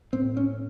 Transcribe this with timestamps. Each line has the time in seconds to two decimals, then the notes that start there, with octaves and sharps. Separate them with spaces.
0.13 A2 C4
0.37 C#4